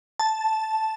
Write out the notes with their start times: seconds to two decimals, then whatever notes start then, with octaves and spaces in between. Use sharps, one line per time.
0.19 A5